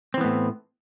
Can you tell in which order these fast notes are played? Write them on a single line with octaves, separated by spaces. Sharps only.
C4 E3 B3 A2